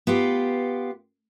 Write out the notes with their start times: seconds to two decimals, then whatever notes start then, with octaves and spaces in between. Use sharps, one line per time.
0.07 B3 F4 G4